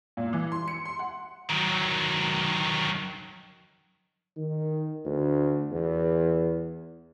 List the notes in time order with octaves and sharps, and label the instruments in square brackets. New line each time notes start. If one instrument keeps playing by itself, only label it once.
[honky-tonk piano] A#2
E3
C6
C#7
C6
F#5
[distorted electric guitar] D#3 F#3
[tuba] D#3
D2
E2